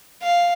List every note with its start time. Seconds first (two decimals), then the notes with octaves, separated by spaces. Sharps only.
0.23 F5